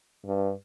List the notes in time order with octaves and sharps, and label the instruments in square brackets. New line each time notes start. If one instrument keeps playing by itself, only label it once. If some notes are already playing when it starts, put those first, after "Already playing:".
[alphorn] G2